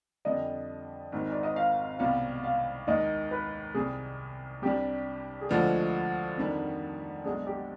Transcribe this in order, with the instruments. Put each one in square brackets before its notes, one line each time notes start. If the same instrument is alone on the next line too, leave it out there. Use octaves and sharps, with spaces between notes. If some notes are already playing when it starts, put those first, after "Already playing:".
[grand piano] F2 D3 G3 D4 [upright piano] D#5
[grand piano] G#1 G#2 D#3
[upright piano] D5
D#5
F5
[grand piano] C2 B2 G3 [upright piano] F5
[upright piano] F5
[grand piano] D#2 D#3 G#3 [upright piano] D#5
[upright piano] B4
[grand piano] C2 C3 G3 [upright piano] G#4
[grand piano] C2 C3 G3 D4 [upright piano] G4
[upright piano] G#4
[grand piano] D2 D3 F3 G#3 D4 [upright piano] B4
[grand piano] F2 D#3 G3 D4
[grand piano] B1 B2 G#3 D4 [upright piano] G#4
[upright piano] G4